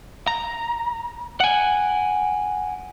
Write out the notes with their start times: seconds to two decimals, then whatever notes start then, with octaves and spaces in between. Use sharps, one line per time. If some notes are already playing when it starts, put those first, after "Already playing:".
0.27 A#5
1.40 F#5 G#5